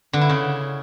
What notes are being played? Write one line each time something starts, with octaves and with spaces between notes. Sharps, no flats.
D3
E4
C#3